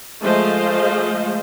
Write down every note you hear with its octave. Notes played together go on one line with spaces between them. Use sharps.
F3 G#3 A3 C5 D#5 F5